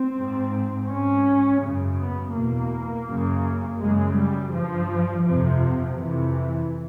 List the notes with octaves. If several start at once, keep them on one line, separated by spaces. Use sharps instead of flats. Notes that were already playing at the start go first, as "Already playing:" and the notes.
Already playing: C4
G#2
G#2 C#4
F#2 C#3
B3
E2 B2 A#3
F#2 C#3
F#2 C#3 G#3
G3
G2 F3
F2 C3 F3
F2 C3 E3